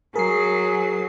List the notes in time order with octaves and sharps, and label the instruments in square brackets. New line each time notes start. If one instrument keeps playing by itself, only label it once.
[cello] F#3 [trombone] G#4 [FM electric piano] A#4 C7